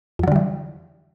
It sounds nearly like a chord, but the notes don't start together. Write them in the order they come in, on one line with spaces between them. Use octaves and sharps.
F2 F#3 D3 G3 E3